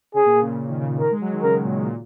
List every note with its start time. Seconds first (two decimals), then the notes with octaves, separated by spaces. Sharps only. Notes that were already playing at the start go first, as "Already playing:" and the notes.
0.14 C#3 G#4
0.25 A#2
0.35 A#2
0.41 C#3
0.47 A#2
0.58 A#2
0.69 D#3
0.79 C#3
0.89 A#2
1.00 D#3 A#4
1.11 G#3
1.21 F#3
1.32 D#3
1.43 C#3 A#4
1.54 D#3
1.64 A#2
1.75 D#3
1.85 A#2